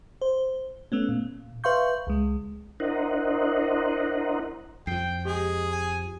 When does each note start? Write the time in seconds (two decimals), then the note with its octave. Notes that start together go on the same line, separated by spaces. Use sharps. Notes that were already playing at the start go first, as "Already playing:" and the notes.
0.22 C5
0.92 A3 B3 C#4
1.09 A#2
1.64 B4 E5 F5 C6 C#6 G6
2.07 C#2 G#3
2.80 D4 E4 A#4 C5 D#5 F#5
4.87 F2 F3 G5 C7
5.25 G#3 G4 G#4
5.71 G#5